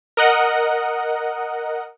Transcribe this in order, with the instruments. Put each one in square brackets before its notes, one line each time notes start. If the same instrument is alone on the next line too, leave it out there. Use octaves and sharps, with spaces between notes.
[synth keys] A#4 D#5 F#5